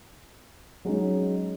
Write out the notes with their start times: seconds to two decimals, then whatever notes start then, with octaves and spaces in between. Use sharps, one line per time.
0.85 F#3 G#3 C#4 D#4